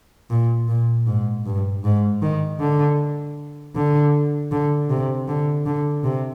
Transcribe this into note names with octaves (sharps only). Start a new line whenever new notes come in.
A#2
A#2
G#2
G2
G#2
D#3
D3
D3
D3
C3
D3
D3
C3